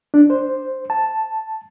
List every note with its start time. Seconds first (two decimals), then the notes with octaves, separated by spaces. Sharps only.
0.14 D4
0.30 C5
0.90 A5